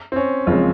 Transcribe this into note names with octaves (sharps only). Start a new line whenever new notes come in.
C4
C#4
F#1 F2 C#3 G#3 C4 F4